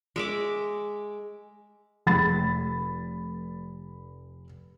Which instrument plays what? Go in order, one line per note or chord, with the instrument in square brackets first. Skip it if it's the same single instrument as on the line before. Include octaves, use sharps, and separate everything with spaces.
[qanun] G#3 E5 D6
[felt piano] F1 B5 A6